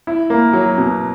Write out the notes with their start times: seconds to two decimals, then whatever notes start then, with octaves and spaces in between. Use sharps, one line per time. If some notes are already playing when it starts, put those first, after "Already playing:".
0.07 E4
0.30 A#3
0.53 F#3
0.78 B2